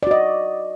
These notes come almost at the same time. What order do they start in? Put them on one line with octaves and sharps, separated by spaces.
D5 F#4 D#5